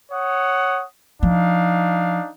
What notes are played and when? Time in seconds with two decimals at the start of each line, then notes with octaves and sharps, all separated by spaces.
0.12 C#5 F#5 D#6
1.23 F3 D4 D#4 F5